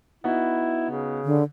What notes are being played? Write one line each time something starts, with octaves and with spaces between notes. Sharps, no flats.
B3 D#4 E4 F#4
C#3
D3